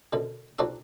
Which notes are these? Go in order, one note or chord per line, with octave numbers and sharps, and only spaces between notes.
F#2 B2 D3
B1 F3 G3 D4 F#4 E5